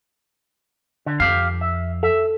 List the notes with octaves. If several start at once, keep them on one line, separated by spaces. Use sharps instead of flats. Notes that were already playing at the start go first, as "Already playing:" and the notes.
D3
F2 G4 F5
E5
A4 E5